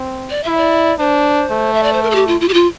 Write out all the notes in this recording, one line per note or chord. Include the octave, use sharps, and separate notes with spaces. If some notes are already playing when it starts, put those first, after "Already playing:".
Already playing: C4
D5
E4 E5
D5
D4 C5
A3
E5
D5
C5
A#4
A4
G4
F4
F4
G4
F4